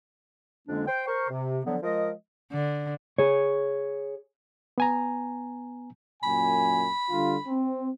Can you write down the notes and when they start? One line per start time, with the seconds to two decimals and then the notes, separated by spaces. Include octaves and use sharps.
0.68 F2 D3 G#3 A#3 C#4 D4
0.88 C5 G5
1.07 A#4 C5 C#6
1.30 C3
1.65 D3 F3 F#3 B3
1.83 F3 G#3 A#4 D#5
2.52 D3
3.18 G#4 C#5
4.78 B3 G#5 A#5
6.23 F#2 A#2 G#5 B5
7.11 D3 G3 F4
7.48 C4